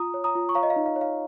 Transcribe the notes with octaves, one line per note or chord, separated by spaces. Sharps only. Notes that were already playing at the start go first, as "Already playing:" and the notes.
Already playing: F4 A#5 D#6
C#5
A#5 D#6
F4
C#6
C#5 F5 A#5
D#5
F5
D#4
F5
C#5
F5